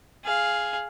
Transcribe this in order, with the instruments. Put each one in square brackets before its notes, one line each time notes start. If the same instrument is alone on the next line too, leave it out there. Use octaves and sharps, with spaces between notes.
[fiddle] G#4 F5